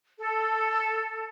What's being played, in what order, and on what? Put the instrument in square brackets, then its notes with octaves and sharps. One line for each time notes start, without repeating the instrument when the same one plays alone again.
[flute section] A4